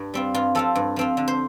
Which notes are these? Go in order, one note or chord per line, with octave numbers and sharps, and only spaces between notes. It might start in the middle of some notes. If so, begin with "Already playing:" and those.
Already playing: G2
G3 C4 F4
G2 F4
F3 C4 F4 A4
G2
F3 C4 F4
D3
C5